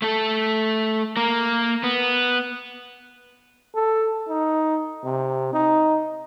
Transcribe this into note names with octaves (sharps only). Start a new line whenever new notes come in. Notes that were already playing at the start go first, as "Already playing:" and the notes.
A3 A4
A#3 A#4
B3
A4
D#4
C3
D#4